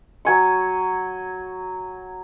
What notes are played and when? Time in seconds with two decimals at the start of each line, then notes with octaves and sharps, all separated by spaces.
0.25 F#3 G#5 C#6